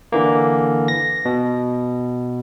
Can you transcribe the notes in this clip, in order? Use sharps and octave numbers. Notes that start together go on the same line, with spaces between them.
D3 E3 A#3
A#6
B2